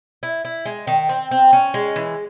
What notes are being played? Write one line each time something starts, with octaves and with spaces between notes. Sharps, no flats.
E4
E4
G#3
D#3
C4
C4
C#4
G#3
E3